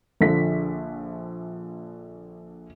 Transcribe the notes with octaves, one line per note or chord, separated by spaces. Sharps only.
A#1 D3 F3 B6